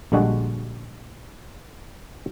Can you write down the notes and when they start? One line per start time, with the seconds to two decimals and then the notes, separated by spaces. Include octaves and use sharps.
0.12 A#1 D3 G3 G#3 D4 F#4